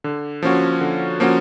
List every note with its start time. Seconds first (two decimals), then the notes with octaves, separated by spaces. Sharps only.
0.04 D3
0.42 F3 A#3 C#4 F#4
0.81 D3
1.20 F3 A#3 C#4 F#4